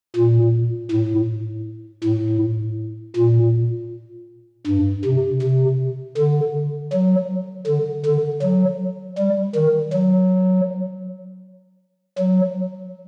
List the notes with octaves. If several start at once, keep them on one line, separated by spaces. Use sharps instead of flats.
A#2
A2
A2
A#2
G2
C3
C3
D3
F#3
D3
D3
F#3
G3
D#3
F#3
F#3